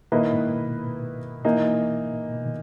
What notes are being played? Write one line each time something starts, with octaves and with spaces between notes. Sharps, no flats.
A#2 D#3 A#3 E4 B4 D#5
G#2
B2
E3 A#3 D#4
G#2
A#2
B2
D#3